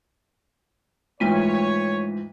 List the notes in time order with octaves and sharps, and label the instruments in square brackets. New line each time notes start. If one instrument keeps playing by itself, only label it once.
[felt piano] G#2 E3 F3 [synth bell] A3 B6 D#7 [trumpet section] C#5